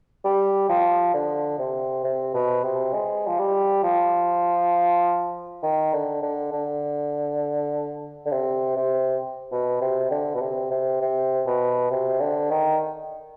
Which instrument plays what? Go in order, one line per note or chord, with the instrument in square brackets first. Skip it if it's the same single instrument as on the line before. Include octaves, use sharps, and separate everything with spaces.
[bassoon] G3
F3
D3
C3
C3
B2
C3
G#3
F3
G3
F3
D#3
D3
D3
D3
D3
C3
C3
B2
C3
D3
B2
C3
C3
C3
B2
C3
D3
D#3